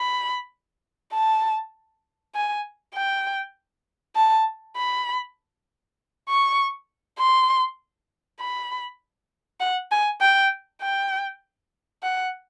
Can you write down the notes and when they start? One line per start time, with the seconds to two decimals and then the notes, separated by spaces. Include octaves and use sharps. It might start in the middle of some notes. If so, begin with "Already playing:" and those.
Already playing: B5
1.13 A5
2.35 G#5
2.95 G5
4.16 A5
4.76 B5
6.28 C#6
7.18 C6
8.40 B5
9.60 F#5
9.91 G#5
10.21 G5
10.81 G5
12.03 F#5